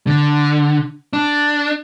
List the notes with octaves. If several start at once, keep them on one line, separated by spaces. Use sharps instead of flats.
D3
D4